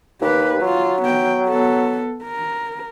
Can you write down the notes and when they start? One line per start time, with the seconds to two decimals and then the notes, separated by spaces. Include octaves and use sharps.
0.21 D#2 G4 B4
0.61 F#3 F4
1.02 B3 G5
1.47 B3 A4
2.23 A#4